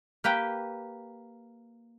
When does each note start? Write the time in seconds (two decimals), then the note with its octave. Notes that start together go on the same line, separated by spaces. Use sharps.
0.24 A#3 G4 B4 G5